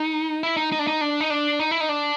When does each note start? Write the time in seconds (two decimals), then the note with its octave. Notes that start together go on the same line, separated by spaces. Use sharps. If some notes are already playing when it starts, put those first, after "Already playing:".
Already playing: D#4
0.43 E4
0.57 D#4
0.72 D#4
0.79 D4
0.87 D#4
1.01 D4
1.20 D#4
1.30 D4
1.59 D#4
1.71 E4
1.80 D#4
1.89 D4